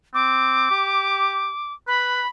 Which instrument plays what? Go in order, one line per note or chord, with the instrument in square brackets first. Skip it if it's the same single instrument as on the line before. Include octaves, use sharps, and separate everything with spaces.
[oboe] C4 [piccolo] D6
[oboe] G4
[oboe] B4 [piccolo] B5